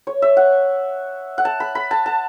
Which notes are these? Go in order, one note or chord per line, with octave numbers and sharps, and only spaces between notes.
C#5
E5
F#5
F#5
A5
B5
B5
A5
A5